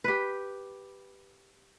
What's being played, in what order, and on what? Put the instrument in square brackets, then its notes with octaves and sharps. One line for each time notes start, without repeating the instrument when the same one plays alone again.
[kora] G4 B4